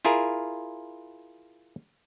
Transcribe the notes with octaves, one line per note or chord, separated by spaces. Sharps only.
E4 F4 G#4 A#4